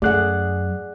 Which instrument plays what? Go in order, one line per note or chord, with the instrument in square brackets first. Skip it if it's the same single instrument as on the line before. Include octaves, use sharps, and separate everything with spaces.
[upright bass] F#2 [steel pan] A3 [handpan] G#4 F#5 [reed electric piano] D5 F#6